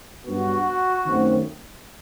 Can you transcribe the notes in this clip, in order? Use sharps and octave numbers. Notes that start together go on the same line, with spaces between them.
G2 F#3 B3 F#4
F#2 D#3 A3 C4